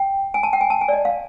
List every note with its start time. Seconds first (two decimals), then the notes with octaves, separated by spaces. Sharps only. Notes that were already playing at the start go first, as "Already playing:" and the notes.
Already playing: G5
0.34 G#5
0.43 A5
0.53 G5
0.61 G#5
0.70 A5
0.81 G#5
0.88 D5
0.93 D#5
1.05 F5